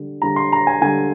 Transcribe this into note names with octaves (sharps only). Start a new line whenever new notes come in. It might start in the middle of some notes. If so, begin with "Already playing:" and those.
Already playing: D3 G3
D3 G3 A#5
C6
A#5
G#5
D3 G3 G#5